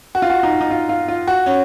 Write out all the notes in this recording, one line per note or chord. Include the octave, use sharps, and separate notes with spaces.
F#4
F4
F#4
D#4
D#4
F4
F4
F4
F#4
C#4